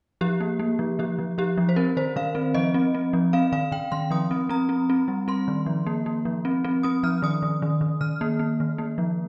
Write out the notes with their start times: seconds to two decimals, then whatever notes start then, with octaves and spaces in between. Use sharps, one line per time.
0.21 F3 G4
0.40 A#3
0.59 A#3
0.79 F3
0.99 F3 G4
1.19 F3
1.38 F3 G4
1.58 F3
1.69 C5
1.76 C4 A#4
1.97 D#3 C5
2.16 D#3 F5
2.35 C4
2.54 F3 D#5
2.74 C4
2.95 C4
3.13 F3
3.33 C4 F5
3.52 D#3 F5
3.72 D#3 G5
3.92 D#3 C6
4.11 F3 D#6
4.31 C4
4.49 C4 A#5
4.69 C4
4.90 C4
5.08 G3
5.28 C4 C6
5.48 D#3
5.66 F3
5.87 A#3
6.06 A#3
6.25 F3
6.45 C4
6.64 C4
6.83 C4 D#6
7.03 F3 F6
7.22 D#3 D#6
7.42 D#3
7.62 D#3
7.81 D#3
8.01 D#3 F6
8.21 A#3
8.39 A#3
8.60 D#3
8.78 A#3
8.98 F3